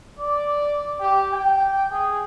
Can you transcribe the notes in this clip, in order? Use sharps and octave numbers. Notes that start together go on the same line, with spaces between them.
D5
G4
G5
G#4